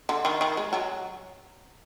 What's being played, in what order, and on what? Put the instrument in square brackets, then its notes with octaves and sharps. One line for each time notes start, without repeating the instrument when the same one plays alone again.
[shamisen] D3
D#3
D#3
G#3
F#3